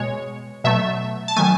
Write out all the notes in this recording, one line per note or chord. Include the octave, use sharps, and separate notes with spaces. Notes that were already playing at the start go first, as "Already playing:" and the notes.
Already playing: B2 G#3 C#5
B2 F#3 A3 E5
A5
D#3 F#3 A3 G#5